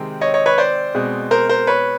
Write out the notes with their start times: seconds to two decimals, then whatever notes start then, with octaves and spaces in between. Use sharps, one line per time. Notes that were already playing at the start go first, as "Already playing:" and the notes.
Already playing: C3 D#3 G#3 C4
0.21 C#5 D#5
0.34 C#5 D#5
0.46 B4 C#5
0.58 C5 D5
0.95 B2 G#3 C4
1.31 A#4 C5
1.49 A#4 C5
1.67 B4 C#5